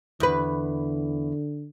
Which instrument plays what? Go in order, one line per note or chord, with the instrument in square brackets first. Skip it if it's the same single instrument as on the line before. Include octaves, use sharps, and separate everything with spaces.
[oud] E2 B4 [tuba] D3